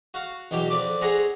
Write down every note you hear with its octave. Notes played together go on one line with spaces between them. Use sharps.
F#4 F5 F#5
E2 B2 F#3 G4 G5
F2 B4 D5 D6
C4 G#4 C#5 F#5 A#5